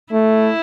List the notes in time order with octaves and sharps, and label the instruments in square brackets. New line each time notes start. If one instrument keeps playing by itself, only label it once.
[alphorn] A3 [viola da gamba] E4